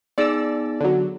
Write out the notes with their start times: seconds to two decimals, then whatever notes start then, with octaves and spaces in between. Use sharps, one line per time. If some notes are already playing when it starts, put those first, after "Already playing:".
0.18 B3 D#4 G#4 D5 E6
0.81 D3 F#3